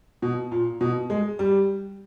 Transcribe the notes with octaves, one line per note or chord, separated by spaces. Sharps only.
B2
A#2
B2
G#3
G3